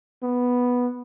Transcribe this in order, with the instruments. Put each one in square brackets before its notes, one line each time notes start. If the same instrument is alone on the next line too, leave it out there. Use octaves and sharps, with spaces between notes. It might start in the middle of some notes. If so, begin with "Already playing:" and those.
[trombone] B3